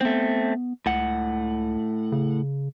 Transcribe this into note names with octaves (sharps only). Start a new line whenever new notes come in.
A3 B3 C4
C#2 A2 F#5
C#3